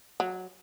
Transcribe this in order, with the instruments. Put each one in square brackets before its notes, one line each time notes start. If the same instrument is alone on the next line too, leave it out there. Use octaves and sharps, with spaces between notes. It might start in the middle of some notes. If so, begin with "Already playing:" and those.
[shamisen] F#3